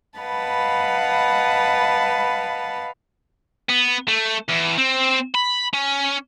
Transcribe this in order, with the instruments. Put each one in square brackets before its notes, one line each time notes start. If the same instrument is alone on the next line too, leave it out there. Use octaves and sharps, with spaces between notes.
[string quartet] B4 D#5 F5 F#5 A5 B5
[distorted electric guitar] B3
A3
E2
C4
B5
C#4